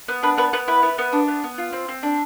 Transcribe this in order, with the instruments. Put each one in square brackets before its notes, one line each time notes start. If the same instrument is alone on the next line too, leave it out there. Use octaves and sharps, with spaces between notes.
[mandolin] B3
D4 B4
B3 B4
B3 B4
E4 B4
B3
B3
D4
B3
B3
F4
C4
C4
D4